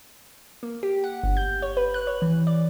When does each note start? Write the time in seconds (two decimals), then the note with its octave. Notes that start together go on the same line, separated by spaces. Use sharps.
0.63 A#3
0.83 G4
1.04 F#5
1.24 G1
1.37 G6
1.62 C#5
1.77 B4
1.94 F#6
2.07 C#5
2.22 E3
2.47 D5